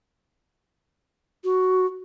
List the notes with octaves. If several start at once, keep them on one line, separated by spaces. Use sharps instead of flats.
F#4